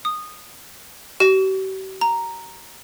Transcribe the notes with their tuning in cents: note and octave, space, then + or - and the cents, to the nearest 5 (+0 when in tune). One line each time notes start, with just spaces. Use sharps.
D#6 -15
G4 -45
A#5 +0